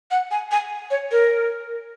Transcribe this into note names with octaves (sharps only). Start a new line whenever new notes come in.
F#5
G#5
G#5
C#5
A#4